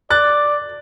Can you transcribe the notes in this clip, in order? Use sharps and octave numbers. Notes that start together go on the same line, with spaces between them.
D5 F#6 A6